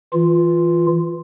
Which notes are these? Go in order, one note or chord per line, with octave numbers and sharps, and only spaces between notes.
E3 F4